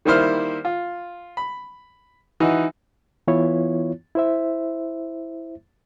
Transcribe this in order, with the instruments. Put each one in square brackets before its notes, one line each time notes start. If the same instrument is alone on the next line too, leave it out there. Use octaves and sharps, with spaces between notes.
[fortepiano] D#3 G3 A#3 E4 C5 F6
F4
B5
E3 D#4 E4 F#4
[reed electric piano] E3 B3 E4 F4 C#5
E4 C5 E5